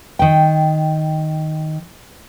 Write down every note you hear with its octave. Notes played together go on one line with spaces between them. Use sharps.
D#3 G5